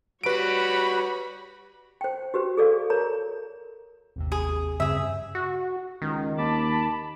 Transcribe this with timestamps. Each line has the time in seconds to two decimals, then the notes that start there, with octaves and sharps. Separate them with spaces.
0.24 G3 F#4 B4 C#5 B5 D7
2.01 C5 G5
2.34 F#4 G4 B4 C5
2.57 G#4 A4 D5 F5
2.90 A#4 C#5 A#5
4.16 G#1 D#2 C3
4.32 G#4
4.80 G2 C#3 C4 G#4 E5
5.35 F#4
6.02 C#2 D#3
6.38 D#2 A5 B5 D6